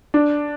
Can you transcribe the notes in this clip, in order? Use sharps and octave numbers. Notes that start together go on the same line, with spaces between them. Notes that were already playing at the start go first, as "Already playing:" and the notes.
D4